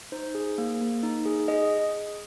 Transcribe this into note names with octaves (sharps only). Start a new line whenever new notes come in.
D#4 C5
G#4
A#3
A#3
D#4
G#4
G#4 D#5